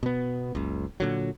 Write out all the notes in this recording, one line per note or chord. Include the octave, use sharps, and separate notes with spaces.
B2 B3
F#1 C#2
A#2 D3 F#3